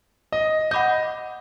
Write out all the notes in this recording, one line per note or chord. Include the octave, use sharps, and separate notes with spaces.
D#5
D#5 F#5 B5 D6 G6